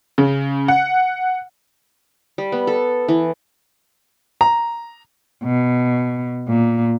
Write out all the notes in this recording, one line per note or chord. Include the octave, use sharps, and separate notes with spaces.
C#3
F#5
G3
B3
A4
E3
A#5
B2
A#2